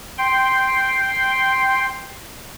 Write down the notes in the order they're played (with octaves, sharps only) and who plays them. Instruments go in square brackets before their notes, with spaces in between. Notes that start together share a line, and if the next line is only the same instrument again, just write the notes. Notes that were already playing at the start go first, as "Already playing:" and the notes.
[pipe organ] G5 C6